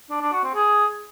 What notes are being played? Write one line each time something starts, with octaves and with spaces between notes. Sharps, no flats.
D4
D4
F#4
C4
G#4